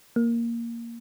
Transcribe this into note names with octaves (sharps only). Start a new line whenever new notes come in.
A#3